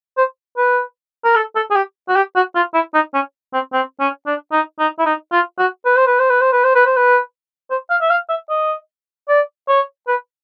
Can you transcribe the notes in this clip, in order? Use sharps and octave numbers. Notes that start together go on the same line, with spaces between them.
C5
B4
A#4
A4
A4
G#4
G4
F#4
G4
F#4
F4
E4
D#4
C#4
C4
C4
C#4
D4
D#4
D#4
E4
D#4
F4
F#4
B4
C5
B4
C5
B4
C5
B4
C5
B4
C5
B4
C5
F5
E5
F5
E5
D#5
D5
C#5
B4